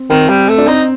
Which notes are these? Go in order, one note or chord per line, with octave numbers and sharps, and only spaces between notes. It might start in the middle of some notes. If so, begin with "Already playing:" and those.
Already playing: C4
D#3 C4
G3
A3
D4
C4 D#4